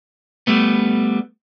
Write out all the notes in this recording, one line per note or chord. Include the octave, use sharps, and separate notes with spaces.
G3 A3 B3